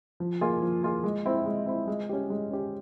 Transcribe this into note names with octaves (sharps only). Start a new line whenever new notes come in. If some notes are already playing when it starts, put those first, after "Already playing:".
F3
A#3 F4 G#4
F3
A#3 F4 G#4
G#3
C4 E4
G#3
C4 E4
G#3
C#4 G4
G#3
C#4 G4